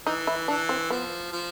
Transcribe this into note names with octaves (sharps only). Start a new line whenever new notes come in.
E3 D#4
E4
E3 D4
C4
F3 B3
F3